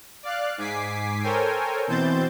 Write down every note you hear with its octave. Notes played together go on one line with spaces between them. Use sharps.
D5 F5 F#6
G#2 G#5 D6 B6 C7
A4 A#4 C5 C#5 G5 G#5
B2 E3 C4 C5 G6 A6